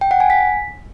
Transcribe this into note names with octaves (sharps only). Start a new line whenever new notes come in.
G5
F#5
G#5
B6